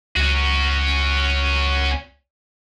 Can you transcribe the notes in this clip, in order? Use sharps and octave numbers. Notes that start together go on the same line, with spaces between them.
C#2 C#4 F#4